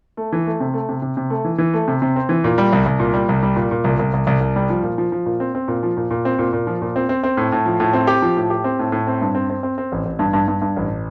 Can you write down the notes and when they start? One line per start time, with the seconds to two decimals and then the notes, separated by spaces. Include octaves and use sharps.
0.17 A3
0.33 E3
0.47 A3
0.60 C3
0.74 A3
0.89 C3
1.02 C3
1.17 C3
1.30 A3
1.45 E3
1.58 E3
1.74 A3
1.88 C3
2.02 C3
2.16 C4
2.29 E3
2.44 A#2
2.58 G3
2.72 C2
2.86 C2
3.00 A#2
3.14 G3
3.29 C2
3.43 G3
3.56 A#2
3.71 A#2
3.84 C2
3.99 C2
4.13 C2
4.27 C2
4.41 C2
4.56 G3
4.70 F3
4.83 A#2
4.98 F3
5.12 F3
5.26 A#2
5.40 C4
5.55 C4
5.68 A#2
5.83 F3
5.97 A#2
6.11 A#2
6.25 C4
6.39 A#2
6.53 A#2
6.67 F3
6.82 A#2
6.96 C4
7.09 C4
7.23 C4
7.37 A2
7.52 A2
7.65 F3
7.80 A2
7.93 C4
8.07 G4
8.22 F3
8.37 A2
8.50 G4
8.64 C4
8.79 A2
8.92 A2
9.07 C4
9.21 G2
9.35 C4
9.50 C4
9.63 C4
9.78 C4
9.92 A1
10.05 A1
10.19 G2
10.33 G2
10.48 G2
10.62 G2
10.76 A1